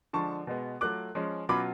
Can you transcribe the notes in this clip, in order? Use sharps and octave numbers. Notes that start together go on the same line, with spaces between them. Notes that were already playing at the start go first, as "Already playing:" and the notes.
D3 F3 G#3 D4 A5 C#6
B2 G#3 B3
F#3 A3 F4 D6 F#6
F3 G#3 C#4
B2 F#3 C#4 F4 B5 D6